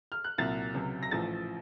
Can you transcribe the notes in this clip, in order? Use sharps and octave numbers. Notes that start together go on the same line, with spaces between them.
F6
F#6
C2 A#2 F#3 A6
C#2 C3 F#3
A#6
A1 A2 F3 A3 A6